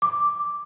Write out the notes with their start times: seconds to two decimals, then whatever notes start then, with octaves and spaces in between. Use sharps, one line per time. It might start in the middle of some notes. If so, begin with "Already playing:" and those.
0.02 D6